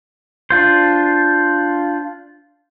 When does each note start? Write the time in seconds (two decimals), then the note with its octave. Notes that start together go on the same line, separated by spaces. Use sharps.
0.50 D4 F4 C5